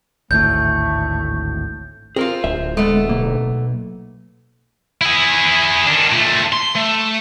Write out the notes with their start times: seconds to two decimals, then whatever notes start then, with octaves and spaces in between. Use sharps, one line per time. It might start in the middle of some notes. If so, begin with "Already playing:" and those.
0.31 G#1 D2 A2 A3 G6
2.16 C4 F4 G#4 A#4 F5
2.44 D1 E5
2.77 G#3 A3 B3
3.09 B1 A#3
5.01 E4 G#4
5.87 D#3 D4
6.12 A#2 A3
6.53 C6
6.76 A3